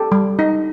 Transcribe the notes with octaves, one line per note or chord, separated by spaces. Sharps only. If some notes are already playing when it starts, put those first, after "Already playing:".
Already playing: G4 A4
G3
D#4